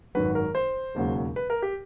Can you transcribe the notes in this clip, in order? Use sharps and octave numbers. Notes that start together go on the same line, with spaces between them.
G#1 F#2 D#3 F#3 B4
A#4
C5
E1 D#2 C#3 F#3
B4
A#4
G4